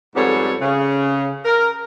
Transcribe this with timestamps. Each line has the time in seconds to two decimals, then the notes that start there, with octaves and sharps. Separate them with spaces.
0.16 F2 G#2 G3 B3 A4 C#5
0.61 C#3
1.45 A#4